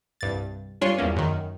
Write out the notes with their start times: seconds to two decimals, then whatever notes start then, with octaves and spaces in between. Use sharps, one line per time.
0.21 C2 G2 A6
0.81 G2 D4 F4 C#5 G#5 C6
0.99 E2 G2 A#3 C#4
1.17 F#2 D#3